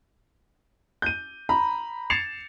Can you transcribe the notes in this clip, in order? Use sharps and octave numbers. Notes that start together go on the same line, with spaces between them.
G6 D#7
A#5 B5
G#6 A6 C7 C#7 E7 F7